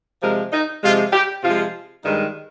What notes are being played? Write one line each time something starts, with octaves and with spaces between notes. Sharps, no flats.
C3 F3 G#3 A#4
D#4
C3 F3 G#3 F4
G4
C3 F3 G#3 F4
G2 D#3 G#3 D#4